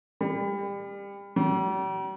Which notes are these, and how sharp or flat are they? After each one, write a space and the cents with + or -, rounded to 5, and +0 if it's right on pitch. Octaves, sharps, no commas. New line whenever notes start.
G3 +30
G3 -45